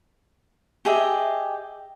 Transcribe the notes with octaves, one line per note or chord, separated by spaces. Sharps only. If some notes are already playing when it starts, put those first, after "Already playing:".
G4 G#4 D#5 E5